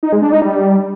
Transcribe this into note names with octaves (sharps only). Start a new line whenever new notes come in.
D#4
G#3
D4
D#4
G3